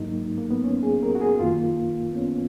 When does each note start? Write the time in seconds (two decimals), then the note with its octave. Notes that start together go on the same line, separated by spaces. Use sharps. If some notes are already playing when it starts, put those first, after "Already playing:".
Already playing: G#2 F#3 A#3 D#4
0.38 A#3
0.50 B3
0.64 C#4
0.83 G#4
1.02 A#4
1.15 F#4
1.21 G#4
1.39 F#2 D#3 A#3 F4
2.11 B3
2.16 C#4